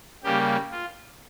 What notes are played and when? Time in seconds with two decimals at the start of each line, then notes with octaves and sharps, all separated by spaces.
0.24 C#3 G3 A#3 G4
0.71 F4